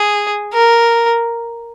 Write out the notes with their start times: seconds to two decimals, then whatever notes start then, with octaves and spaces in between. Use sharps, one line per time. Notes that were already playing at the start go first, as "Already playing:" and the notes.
Already playing: G#4
0.53 A#4